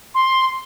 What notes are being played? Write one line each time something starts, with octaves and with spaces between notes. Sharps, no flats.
C6